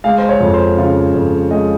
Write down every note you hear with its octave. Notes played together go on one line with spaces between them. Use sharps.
G#3 F5
C5
C#5
F2
C5
C#3 F4
F2
G#3 D#5